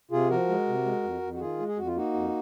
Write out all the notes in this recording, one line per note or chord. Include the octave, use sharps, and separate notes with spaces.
C3 F4 G#4
F3 F#4 A#4
G#3
C3
G#3
F2
F2
F#4
D#3 F4 G#4
G#3
G#4
F2 F#4
F4
A#3 D#4 F#4
F2